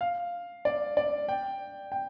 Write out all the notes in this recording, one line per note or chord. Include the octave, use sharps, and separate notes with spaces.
F5
D5
D5
G5
G5